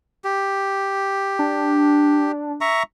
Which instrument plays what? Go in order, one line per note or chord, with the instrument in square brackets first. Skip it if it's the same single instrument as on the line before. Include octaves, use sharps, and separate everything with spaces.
[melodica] G4
[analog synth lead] D4
[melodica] E5 A#5 C#6